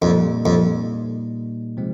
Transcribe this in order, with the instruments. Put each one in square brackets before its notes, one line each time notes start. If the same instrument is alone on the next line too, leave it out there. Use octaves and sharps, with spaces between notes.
[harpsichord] F2 [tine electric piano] A#2 G3 A#3 D#4
[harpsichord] F2
[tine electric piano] C3 F3 G#3 C4